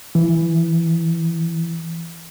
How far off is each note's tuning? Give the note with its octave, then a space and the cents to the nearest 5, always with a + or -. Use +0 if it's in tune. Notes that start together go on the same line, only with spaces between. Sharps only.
E3 +10